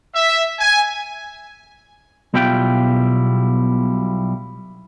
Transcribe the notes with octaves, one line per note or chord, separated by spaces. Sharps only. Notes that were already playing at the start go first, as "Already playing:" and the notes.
E5
G#5
B1 B2 G3 E4 F4 G5